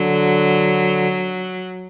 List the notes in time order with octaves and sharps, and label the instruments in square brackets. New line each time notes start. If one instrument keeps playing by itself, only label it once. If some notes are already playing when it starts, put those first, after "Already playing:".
Already playing: [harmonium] D3 [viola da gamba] F#3